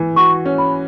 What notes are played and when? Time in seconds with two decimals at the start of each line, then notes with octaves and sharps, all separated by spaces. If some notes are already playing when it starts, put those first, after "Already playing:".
Already playing: E3
0.16 F#4 C#6
0.46 C#4
0.58 B5